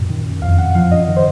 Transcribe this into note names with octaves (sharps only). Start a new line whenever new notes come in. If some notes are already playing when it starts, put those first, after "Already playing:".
Already playing: F#2 A#2
D#3
F#2
F2 F5
F2 F#5
F3 F5
F#2 D#5
D#3
C5